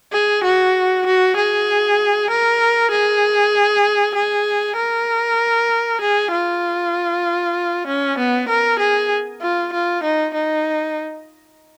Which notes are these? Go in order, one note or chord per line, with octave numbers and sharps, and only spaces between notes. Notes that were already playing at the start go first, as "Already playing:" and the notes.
G#4
F#4
F#4
G#4
A#4
G#4
G#4
A#4
G#4
F4
C#4
B3
A#4
G#4
F4
F4
D#4
D#4